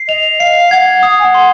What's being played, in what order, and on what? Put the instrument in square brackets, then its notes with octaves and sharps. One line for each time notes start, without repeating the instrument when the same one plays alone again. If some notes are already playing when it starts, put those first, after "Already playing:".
Already playing: [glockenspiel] C7
[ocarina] D#5 [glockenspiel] F7
[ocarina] F5 [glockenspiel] C7
[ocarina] F#5 [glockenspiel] G#6
[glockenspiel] D#6
[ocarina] G#5
F#5
[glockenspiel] C6